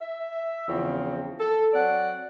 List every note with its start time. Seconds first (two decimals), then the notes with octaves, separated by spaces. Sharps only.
0.01 E5
0.68 E2 C#3 F3 C4
1.39 A4
1.73 F#3 C4 D5 F#5